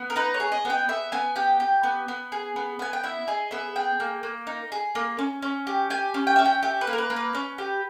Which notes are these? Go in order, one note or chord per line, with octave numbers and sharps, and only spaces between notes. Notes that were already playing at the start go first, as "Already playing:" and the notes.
Already playing: B3
A#4
D#4 B4
C#5
G#4
D#5
B3 G5
B3 E5
B3 G#5
G4 G5
G4
B3
B3
G#4
B3
B3 G#5
G5
E4 E5
G#4 D#5
B3 E5
G#4 G5
A#3
A#3
D#4
G#4
A#3
C#4
C#4
G4
G4 G#5
C#4
G5
C#4 E5
G5
G4 E5
B4
A#3
A#4
B4
A#3
B4
C#4
G4